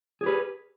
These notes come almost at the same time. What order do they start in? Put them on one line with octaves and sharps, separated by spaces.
G#4 G4 B4